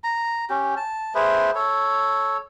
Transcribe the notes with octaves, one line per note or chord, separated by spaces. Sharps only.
A#5
C#4 G4
A5
A3 G#4 B4 C5
A4 C#5